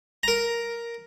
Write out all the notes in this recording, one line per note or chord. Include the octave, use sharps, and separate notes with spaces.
A#4 A#5